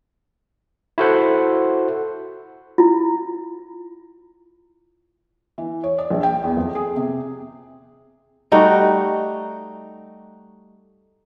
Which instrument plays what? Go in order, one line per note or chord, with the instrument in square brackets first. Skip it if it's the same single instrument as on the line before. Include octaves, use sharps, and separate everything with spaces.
[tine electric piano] E4 F#4 A4 C5 F#5
[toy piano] E4 F4
[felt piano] E3
C#5
D5
A#1
G5
E2
F2
G#4
C3
[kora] G3 A3 D#4 F#4